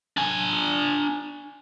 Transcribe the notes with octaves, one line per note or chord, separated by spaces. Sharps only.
D4 G#5